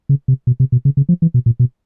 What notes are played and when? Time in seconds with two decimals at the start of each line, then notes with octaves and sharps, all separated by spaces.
0.09 C#3
0.28 C3
0.47 B2
0.60 C3
0.72 B2
0.85 C#3
0.97 C#3
1.09 F3
1.22 E3
1.34 B2
1.46 A#2
1.60 B2